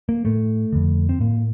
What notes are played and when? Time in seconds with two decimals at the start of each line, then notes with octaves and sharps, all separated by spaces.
0.09 A#3
0.25 A2 A3
0.73 F2 D3
1.09 C4
1.20 A2 A#3